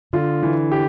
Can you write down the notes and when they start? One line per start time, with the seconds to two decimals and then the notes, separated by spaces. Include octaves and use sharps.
0.13 D3 F4
0.43 E3
0.72 G4